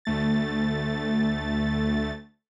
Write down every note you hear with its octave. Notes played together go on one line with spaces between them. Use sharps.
D2 A3 A6